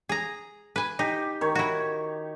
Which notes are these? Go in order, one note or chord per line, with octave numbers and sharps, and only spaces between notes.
G#4 A#5
B4 G#5
D#4 G4
D#3 C#5
E4 F#4